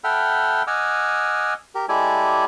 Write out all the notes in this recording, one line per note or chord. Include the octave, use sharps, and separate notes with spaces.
A4 E5 F#5 G5 B5 F6
D#5 F#5 G#5 D6 E6 F6
G4 A#4
G#3 E4 G4 A4 D5 G#5